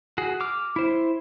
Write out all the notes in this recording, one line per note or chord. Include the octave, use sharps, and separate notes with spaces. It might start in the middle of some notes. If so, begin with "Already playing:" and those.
F#4 G#4
D6 F6
E4 C5